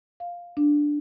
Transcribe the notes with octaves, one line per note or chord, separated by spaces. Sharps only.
F5
D4